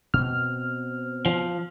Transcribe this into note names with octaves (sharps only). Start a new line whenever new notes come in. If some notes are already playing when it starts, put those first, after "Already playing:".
B2 C4 F6
F3